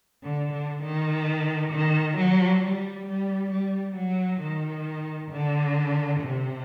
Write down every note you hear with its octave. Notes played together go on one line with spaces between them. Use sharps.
D3
D3
D#3
D#3
F#3
G3
G3
G3
F#3
D#3
D3
C3